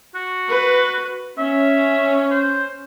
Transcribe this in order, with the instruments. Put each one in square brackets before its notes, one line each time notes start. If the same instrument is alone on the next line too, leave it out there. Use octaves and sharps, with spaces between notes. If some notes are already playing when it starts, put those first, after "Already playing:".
[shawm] F#4
[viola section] B4
[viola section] C#4 [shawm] E5
[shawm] C5